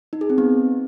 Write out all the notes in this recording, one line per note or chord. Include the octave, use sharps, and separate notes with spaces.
D#4
G#4
C4
B3